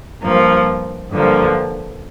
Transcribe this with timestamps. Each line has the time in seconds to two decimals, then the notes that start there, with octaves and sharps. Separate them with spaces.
0.22 G2 F3 A#3
1.11 G2 D3 F3 A#3